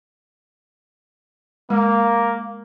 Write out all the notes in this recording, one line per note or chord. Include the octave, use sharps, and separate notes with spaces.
G#3 A#3